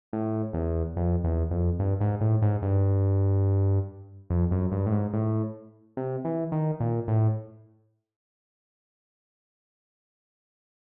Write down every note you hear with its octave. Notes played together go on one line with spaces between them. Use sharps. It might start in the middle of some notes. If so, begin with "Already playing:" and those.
A2
E2
F2
E2
F2
G2
G#2
A2
G#2
G2
F2
F#2
G2
A2
G#2
A2
C3
E3
D#3
A#2
A2